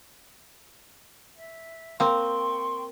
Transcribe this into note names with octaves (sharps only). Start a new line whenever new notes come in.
E5
A#3 C4 G5 C6 C#6